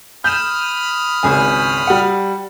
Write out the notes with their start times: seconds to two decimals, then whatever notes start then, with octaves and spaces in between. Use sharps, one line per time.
0.24 B5 D#6 F6 G6 E7
1.23 G#1 C#2 G#5
1.87 G3 F#5